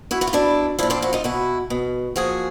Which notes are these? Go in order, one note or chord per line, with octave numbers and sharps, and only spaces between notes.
E4 F#4
E4 F#4
F4
B2 D4 E4
A#2 F3 D4 E4
C4 D4
E4 F#4
D#4 F4
B2 E4 F#4
B2
A#2 F3 F#4 G#4